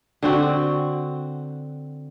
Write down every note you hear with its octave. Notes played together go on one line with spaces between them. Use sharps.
D3 C4 F#4